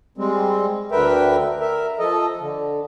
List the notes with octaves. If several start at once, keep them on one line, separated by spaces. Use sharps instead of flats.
G3 G#3 C4
D2 D3 A#4 B4 E5 G5
A#4 E5
F3 A4 D#5
D3